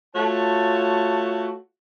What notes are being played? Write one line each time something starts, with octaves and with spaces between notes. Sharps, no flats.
A3 F4 F#4 C#5 A5